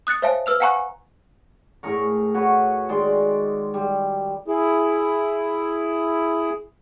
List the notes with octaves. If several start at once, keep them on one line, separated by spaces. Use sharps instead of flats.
D#6 F#6 A6 C#7
C5 C#5 E5 F5 G#5 A5
B4 E6 F6 F7
F5 F#5 G#5 A#5 C#6 F#6
G#5
A2 G#4 A#4 C#6
F#4 B4 C#5
D#3 G#3 D5 C6
G3
E4 G#4